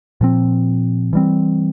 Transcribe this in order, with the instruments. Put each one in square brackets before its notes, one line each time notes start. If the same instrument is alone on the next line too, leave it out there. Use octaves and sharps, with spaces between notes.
[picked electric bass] A#2 F3 C4
E3 G3 C4